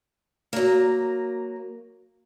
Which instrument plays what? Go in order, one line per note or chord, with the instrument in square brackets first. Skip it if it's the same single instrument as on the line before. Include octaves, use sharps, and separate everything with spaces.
[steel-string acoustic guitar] F#3 A#3